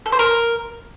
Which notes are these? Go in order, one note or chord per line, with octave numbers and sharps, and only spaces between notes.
A4
C5
A#4